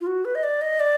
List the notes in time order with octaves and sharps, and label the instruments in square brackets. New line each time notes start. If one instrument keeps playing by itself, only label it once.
[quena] F4
F#4
B4
D#5
D5
D#5
D5